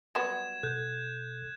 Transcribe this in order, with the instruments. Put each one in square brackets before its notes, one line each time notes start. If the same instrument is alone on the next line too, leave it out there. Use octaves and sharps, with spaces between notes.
[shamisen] F#3 G3 B3 [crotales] G#6 E7
[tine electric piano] B2 A4 [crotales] F#6 G6